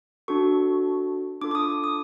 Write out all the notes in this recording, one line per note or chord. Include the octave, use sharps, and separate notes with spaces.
D4 F#4 A4 C#6
D4 F4 A4 D6
D6
D#6
D6
D#6